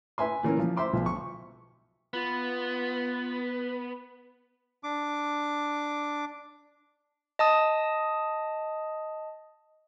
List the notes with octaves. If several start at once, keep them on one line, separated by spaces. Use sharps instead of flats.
B4 E5 G#5 C6
A#2 E3 C#4 A#4
F3
C5 E5 C6 D6
B1 F3 E5
C#6
B3 F4 B4
D4 D6
D#5 A5 D#6